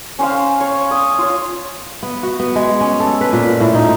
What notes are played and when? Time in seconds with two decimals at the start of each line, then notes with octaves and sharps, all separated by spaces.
0.19 C#4 C5 F5
0.61 C#5
0.91 D#6
1.18 F4 C#5
2.03 B3
2.23 F#4
2.39 B3
2.56 G#3
2.81 C#4
3.00 A4
3.21 B4
3.33 A#2
3.60 A2
3.75 D#4